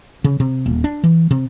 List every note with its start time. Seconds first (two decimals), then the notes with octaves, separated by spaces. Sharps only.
0.24 C#3
0.40 C3
0.66 D#1
0.84 D4
1.04 E3
1.31 C3